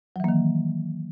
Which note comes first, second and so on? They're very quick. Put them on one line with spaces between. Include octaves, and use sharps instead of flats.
F#3 E3 A#3 D#3